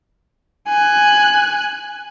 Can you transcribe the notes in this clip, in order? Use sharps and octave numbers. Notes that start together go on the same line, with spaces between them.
G#5 F#6